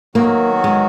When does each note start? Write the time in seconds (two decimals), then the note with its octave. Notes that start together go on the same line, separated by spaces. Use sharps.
0.15 D#3 F#3 A#3 B3 F#4
0.64 G#3